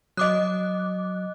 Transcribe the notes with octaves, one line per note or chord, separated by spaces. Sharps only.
F#3 D#5 D6 D#6 F#6